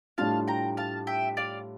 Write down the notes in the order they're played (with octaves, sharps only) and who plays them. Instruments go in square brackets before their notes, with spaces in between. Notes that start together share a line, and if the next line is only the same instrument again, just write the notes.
[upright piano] A2 G3 D4 F4 [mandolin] F5 A5
[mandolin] G5 A#5
F5 A5
E5 G5
D5 F5